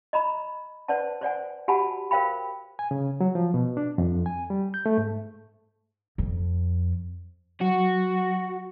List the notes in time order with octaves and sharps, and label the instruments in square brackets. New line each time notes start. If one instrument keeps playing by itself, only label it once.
[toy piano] D#5 A#5 B5
B4 C5 D5 F#5 A5
C5 D5 F#5 G#5
F#4 G4 F#5 G#5 A5 B5
A#4 C5 F5 G5 B5
[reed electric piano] G#5
C#3
F#3
F3
B2
D4
F2
G#5
G3
G6
A3
G#2
[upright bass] F2
[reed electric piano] F#3 [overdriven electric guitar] F#4